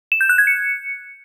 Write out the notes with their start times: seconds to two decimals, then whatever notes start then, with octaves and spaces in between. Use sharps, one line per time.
0.12 E7
0.21 G6
0.29 F#6
0.38 G#6
0.47 C#7